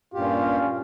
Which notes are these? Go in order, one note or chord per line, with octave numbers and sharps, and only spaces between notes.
G2 A#2 C#4 F4 G4